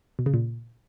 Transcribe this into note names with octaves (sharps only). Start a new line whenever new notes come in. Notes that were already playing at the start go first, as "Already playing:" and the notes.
B2
C#3
A#2